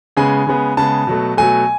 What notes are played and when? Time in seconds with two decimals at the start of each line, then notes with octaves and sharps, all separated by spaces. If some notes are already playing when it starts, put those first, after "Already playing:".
0.17 C#3 G#3 B3 G#5
0.47 C#3 G#3 B3
0.77 C#3 G#3 B3 A5
1.07 B2 F#3 A3
1.37 B2 F#3 A3 G#5